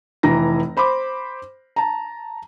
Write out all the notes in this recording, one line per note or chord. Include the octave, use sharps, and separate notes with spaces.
F1 E3 A#5 A#6
C5 B5 C6 D6
A5 A#5